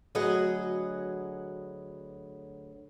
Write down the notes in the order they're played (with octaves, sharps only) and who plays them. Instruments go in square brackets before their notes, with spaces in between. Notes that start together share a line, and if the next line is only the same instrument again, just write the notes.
[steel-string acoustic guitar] D2 F#3 G#4 B4 D#5 F#5